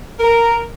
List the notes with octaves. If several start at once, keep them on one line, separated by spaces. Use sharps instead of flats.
A#4